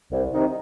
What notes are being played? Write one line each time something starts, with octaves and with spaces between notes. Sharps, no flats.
C2
C3 D#3 C4 D#4